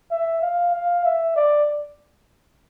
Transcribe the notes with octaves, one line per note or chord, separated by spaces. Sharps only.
E5
F5
F5
E5
D5